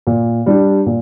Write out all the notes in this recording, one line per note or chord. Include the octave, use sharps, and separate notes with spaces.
A#2
G3 D4 G4
A#2